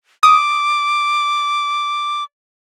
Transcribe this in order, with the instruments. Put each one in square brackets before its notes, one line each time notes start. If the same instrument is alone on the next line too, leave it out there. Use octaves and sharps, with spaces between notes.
[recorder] D6 [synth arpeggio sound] D#6